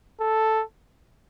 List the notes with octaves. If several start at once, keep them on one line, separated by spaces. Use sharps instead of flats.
A4